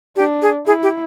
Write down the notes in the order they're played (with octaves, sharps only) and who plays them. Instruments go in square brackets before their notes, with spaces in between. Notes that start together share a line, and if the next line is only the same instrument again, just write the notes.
[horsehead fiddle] D4 [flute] G4
[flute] G#4
[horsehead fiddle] E4 [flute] G#4
[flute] G4